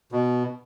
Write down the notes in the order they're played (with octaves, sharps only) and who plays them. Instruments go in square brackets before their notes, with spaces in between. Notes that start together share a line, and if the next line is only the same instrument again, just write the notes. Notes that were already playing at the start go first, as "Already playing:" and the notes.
[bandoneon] B2